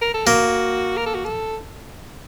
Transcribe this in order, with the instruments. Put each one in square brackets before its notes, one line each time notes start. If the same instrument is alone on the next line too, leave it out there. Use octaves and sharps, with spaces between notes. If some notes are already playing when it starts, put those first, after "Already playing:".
[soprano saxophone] A#4
A4
[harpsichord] A#3 [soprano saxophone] F#4
[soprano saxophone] A#4
A4
F#4
A4